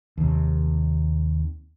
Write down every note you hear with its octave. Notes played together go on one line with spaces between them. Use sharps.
D#2 C3